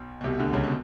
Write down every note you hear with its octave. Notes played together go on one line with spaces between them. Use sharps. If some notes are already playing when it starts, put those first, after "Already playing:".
Already playing: B1 B2
B2
C2 C3
D2 D3
C#2 C#3
B2